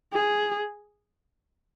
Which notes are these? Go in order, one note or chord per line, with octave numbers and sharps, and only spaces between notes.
G#4